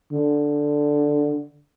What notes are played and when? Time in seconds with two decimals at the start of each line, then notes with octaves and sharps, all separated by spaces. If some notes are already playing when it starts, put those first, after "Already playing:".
0.13 D3